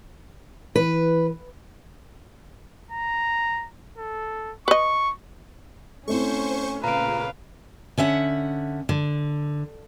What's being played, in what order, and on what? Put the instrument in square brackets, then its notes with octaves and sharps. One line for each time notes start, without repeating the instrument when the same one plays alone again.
[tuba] E3 [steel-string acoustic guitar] B4
[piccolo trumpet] A#5
A4
[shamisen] B4 D#5 [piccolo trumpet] C#6
[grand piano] A3 C4 E4 [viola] C#4 [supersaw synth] C5 C#6
[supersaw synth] A#2 C#3 [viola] B4 F5 [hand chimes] A#5 D7
[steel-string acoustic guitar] D3 C#4 E5 F#5
D3